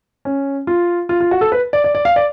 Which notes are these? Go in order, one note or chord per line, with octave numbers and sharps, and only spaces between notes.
C#4
F4
F4
F4
F#4
A4
B4
D5
D5
D5
F5
D5